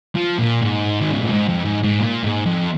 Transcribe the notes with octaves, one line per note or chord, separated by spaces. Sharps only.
F3
A#2
G#2
D#3
C#3
A#2
G#2
F2
G#2
G#2
A#2
G#2
F2